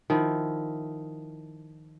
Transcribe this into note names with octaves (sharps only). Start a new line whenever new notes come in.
D#3 F3 E4